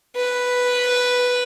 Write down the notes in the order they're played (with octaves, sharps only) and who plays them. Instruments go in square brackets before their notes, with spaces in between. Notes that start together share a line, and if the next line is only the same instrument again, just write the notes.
[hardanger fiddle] B4